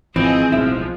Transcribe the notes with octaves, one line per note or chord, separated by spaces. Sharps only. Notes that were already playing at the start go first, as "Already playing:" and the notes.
G#1 E3 F3 C4 G#4 D#5
D1 B1 F3 G#3 E4